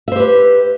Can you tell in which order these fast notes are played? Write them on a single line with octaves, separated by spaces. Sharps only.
E5 C5 G4 B4